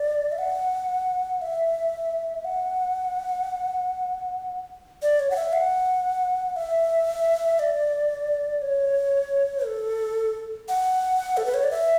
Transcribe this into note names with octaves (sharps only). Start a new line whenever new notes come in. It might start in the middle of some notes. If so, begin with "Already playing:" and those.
Already playing: D5
E5
F#5
E5
F#5
D5
C#5
F#5
E5
F#5
E5
D5
C#5
A4
F#5
A4
B4
C#5
D5
E5